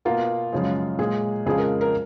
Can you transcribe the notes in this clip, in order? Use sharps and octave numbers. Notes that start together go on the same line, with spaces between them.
B2 A#3 F4
F#2 C#3 F3 G#3
A#2 G#3 G#4
F2 C#3 F3 G#3 G#4
A#4
A#4